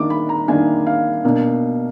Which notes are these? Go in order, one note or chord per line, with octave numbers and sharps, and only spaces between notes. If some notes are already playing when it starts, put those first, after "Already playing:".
Already playing: D#3 A#3 D4 D6
B5
A#5
D#3 A#3 D4 G#5
F5
B2 A#3 D4